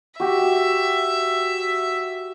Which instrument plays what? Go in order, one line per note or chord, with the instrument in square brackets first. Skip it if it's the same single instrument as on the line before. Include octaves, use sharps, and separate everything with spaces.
[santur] F#4 G4 [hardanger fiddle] E5